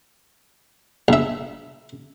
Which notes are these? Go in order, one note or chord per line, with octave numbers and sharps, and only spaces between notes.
A#1 E5